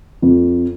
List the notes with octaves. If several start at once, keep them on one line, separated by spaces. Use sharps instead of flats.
F2